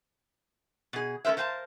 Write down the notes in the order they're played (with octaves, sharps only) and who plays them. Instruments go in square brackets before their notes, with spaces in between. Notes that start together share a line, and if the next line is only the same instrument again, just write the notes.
[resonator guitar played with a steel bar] B2 G#4
A3 C#4 A#4 C5 E5
A#4 C5 F5 G5 A5